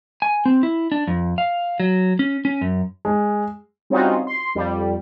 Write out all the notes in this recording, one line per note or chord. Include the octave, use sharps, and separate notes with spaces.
G#5
C4
E4
D4
F2
F5
F#3
C#4
C#4
F#2
G#3
G3 C4 C#4 D#4 F4 F#4
C6
F2 G3